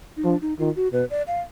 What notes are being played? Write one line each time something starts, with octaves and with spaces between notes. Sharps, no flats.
D#4
F3 D4
D#4
D#3 F4
F#4
B2 B4
D5
F5